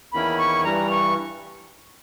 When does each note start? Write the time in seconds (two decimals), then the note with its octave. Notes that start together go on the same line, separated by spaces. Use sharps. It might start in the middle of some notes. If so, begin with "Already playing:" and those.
0.12 E2 D#3 A#3 C#4 E4 B5
0.38 C#6
0.64 G2 E3 G3 A#5
0.90 C#6